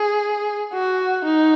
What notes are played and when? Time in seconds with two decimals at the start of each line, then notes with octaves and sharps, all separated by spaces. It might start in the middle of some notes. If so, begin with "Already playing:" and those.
Already playing: G#4
0.73 F#4
1.25 D#4